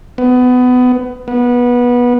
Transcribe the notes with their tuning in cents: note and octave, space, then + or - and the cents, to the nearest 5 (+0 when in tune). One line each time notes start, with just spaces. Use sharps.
B3 +20
B3 -20